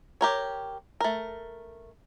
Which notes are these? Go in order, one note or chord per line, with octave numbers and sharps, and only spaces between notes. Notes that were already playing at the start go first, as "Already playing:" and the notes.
G4 A#4 C#5
A3 A#4